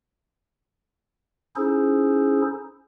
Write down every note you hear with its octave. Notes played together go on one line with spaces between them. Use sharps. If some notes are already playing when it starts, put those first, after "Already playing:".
C#4 D#4 E4 G#4 A4 C5